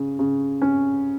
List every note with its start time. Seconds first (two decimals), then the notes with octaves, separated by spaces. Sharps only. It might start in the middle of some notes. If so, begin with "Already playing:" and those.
Already playing: C#3
0.19 C#3
0.62 C#4